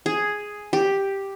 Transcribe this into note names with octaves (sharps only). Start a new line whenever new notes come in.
G#4
G4